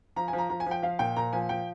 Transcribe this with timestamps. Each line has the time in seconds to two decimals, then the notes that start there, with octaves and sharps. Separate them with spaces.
0.16 F3 A#5
0.28 G#5
0.33 F3
0.38 A#5
0.50 F3 A#5
0.60 G#5
0.66 F3 G5
0.83 F3 F5
0.99 A#2 G5
1.16 A#2 A#5
1.33 F3 G#5
1.49 F3 G5